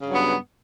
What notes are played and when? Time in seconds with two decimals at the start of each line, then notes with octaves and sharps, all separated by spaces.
0.01 C#3
0.05 G2
0.09 F#3
0.14 B3